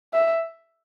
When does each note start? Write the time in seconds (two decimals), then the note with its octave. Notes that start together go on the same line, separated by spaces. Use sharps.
0.13 E5